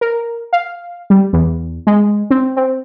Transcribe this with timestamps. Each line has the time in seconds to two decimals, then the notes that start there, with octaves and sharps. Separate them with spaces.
0.01 A#4
0.53 F5
1.10 G3
1.33 E2
1.87 G#3
2.31 C4
2.57 C4